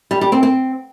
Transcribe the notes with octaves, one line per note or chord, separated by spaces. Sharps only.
G3
G3
C4
C4